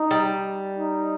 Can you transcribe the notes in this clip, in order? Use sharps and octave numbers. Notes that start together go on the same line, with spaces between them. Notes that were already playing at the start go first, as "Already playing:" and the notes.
Already playing: D#4
G3
D#4